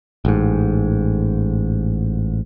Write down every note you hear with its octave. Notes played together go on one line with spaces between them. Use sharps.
A1 G#2